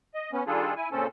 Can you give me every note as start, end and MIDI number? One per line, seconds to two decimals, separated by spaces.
0.14 0.31 75
0.33 0.44 59
0.33 0.44 61
0.47 0.74 51
0.47 0.74 55
0.47 0.74 62
0.47 0.74 65
0.47 0.74 68
0.47 0.74 69
0.76 0.89 64
0.76 0.89 80
0.91 1.07 46
0.91 1.07 49
0.91 1.07 60
0.91 1.07 61
0.91 1.07 69